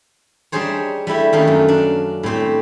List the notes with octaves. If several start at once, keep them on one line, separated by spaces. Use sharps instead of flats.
G3 D4 D#4 G#4 C5 C#5
G3 A3 E4 G4
D#3 A3 A#3 C#4
F#2
D4
A2 G3 C4 G4